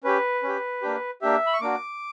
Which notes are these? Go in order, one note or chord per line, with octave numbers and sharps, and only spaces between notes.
C#4 G4 B4
C#4 G4
A#3 D4 G4
A#3 D4 G4 E5
B5
C#6
A#3 D4 F#4 D6